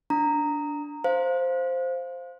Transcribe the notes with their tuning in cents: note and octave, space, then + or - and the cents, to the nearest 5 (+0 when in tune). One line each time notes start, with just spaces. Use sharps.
D4 -15 A#5 -10
C5 +0 F5 +0